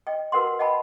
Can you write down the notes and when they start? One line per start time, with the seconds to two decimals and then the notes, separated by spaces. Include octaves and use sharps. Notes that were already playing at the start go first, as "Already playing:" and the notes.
0.07 D#5 G5
0.32 F#4 A#4 B4 F#5 C6
0.59 D#5 F#5 G5 A5 B5